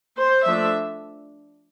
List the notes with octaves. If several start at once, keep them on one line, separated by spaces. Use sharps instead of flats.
C5
F3 A3 D4 E5